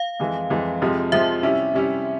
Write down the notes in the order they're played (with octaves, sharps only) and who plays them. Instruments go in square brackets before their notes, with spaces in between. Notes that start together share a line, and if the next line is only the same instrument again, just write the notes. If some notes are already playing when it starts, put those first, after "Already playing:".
Already playing: [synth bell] F5
[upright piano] F2 E3 G#3
F2 E3 G#3
F2 C3 F3 G#3
[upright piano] F2 C3 F3 G#3 [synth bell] E5
[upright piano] C3 G3 C#4 E4
C3 G3 C#4 E4